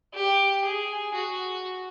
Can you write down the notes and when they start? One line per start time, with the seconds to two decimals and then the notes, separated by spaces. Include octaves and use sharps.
0.14 G4
0.65 G#4
1.14 F#4